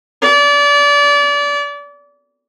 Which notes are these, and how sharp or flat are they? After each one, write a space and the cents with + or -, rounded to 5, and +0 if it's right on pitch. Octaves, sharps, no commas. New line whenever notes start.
D5 -30